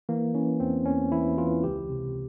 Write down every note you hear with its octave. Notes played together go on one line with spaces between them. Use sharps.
E3 A#3
E3 C#4
E2 C4
E2 C#4
E3 E4
E3 F4
C#2 G4
C3